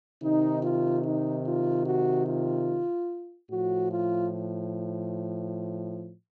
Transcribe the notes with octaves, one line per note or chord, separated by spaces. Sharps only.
C3 D#3 D#4
F4
D#4
F4
F#4
F4
A2 F3 F#4
F4